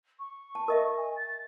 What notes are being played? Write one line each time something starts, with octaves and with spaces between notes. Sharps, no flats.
C#6
A5
A#4 D#5 E5
G#5
A6